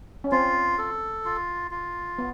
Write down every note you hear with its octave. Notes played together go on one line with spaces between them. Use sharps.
C#4
C4 F4
A4
F4
F4
B3